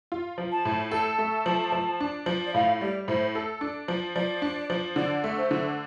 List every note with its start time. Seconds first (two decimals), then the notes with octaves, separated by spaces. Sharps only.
0.12 F4
0.38 F3
0.52 A5
0.65 A2
0.92 A4 A5
1.18 A3
1.46 F3
1.72 F3
2.00 D4
2.26 F3
2.46 D5
2.54 A2 F5
2.81 G3 D5
3.08 A2 C5
3.35 A4
3.61 D4
3.88 F3
4.15 F3 D5
4.42 D4
4.70 F3
4.96 D3 D5
5.24 A3
5.37 C5
5.51 D3